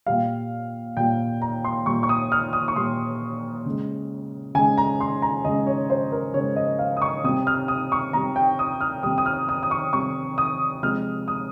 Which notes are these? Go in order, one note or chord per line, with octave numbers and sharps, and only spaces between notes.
A#2 G3 F5
A#2 G3 G5
A#5
C6
A#2 G3 C#6
C#6
D#6
F6
D#6
C#6
A#2 G3 C6
C#3 G#3
C#3 G#3 G#5
A#5
C6
A#5
C#3 G#3 D#5
C#5
C5
A#4
C#3 G#3 C#5
D#5
F5
D#6
C#6
C3 G3 D#6
F6
D#6
C#6
C3 G3 A#5
G5
D#6
F6
C3 G3 D#6
D#6
F6
D#6
D#6
C#6
C3 G3 C#6
D#6
C3 F3 G#3 F6
D#6